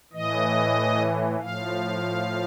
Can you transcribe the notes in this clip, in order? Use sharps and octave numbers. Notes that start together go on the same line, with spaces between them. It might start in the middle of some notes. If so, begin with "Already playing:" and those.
A2 E3 D#5
A2 F3 F5